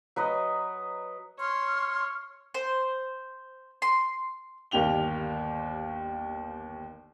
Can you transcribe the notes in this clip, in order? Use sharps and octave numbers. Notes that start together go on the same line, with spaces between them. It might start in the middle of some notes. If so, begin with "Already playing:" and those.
F#3 B4 D#5
C#5 C6 F6
C5
C6
G1 D#2 A#3 G4 F7 G7